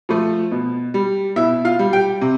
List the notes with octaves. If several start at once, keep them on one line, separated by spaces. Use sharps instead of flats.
F3 A3
B2
G3
B2 E4 E5
F4 F5
G3
G4 G5
C3